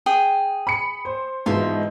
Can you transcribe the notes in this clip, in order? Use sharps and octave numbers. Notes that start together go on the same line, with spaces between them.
G#4 G5 D#6
B5 C#7
C5
G#2 B2 E3 F4 E5